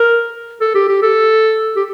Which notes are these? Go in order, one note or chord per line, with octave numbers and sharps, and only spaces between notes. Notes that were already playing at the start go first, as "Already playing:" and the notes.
Already playing: A#4
A4
G4
G4
A4
G4